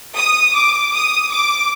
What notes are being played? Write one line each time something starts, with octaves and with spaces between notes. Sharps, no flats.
D#6
D6
D#6
D6